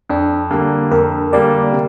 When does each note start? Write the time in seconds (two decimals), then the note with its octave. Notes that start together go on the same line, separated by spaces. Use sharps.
0.09 F2 D4
0.51 D3 G3 A#3
0.91 F2 A#4
1.32 D3 G3 A#3 D5
1.73 C3